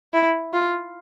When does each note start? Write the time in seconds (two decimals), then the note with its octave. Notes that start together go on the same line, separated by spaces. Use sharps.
0.13 E4
0.53 F4